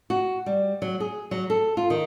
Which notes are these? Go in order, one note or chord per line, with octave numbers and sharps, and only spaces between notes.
F#4
G3
F#3
G#4
F#3
A4
F4
D#3